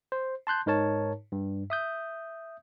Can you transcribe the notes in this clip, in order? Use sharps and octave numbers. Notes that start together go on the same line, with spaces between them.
C5
A5 C6 F#6 G6
G#2 D#4 A#4 C#5 A5
G2
E5 D#6 G6